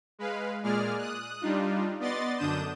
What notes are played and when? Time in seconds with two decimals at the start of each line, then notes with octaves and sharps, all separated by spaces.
0.19 G#3 B4 F5
0.63 A#2 G#3 G#4 D5 F6
0.98 D#6 F#6
1.41 G3 D4 D#4 F4
2.00 B3 D5 D#5 C6 A6
2.37 F#2 D3 D4 D#6 G6 E7